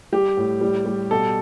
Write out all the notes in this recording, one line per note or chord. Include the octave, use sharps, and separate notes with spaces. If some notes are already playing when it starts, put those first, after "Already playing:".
G3 G4
A2
G3
G3
B2 A4